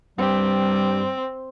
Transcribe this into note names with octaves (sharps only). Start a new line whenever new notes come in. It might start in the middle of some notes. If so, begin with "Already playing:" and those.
G2 G3 C4 G4